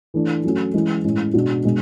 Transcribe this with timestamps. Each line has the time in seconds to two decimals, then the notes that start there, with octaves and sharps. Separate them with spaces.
0.14 E3 A3 D4
0.44 F#3 A3 C#4 F#4
0.74 E3 G#3 C#4 E4
1.05 A2 G#3 C#4
1.34 B2 G#3 D4 F#4
1.65 B2 G#3 D4